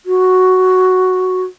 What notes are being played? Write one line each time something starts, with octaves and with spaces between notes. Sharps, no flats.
F#4